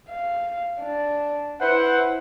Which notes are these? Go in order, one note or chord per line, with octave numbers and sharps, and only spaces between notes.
F5
D4
E4 B4 C5 F#5